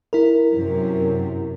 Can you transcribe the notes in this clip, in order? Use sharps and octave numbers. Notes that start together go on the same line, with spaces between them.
E4 A#4
F#2 C3